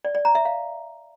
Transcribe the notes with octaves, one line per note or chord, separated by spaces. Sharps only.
D5
D5
A#5
E5
F5